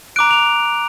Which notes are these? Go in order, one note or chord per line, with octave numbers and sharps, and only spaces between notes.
A#5 D6 F#6 D7
F7